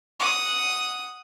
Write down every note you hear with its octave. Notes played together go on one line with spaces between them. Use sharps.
F#5 D#6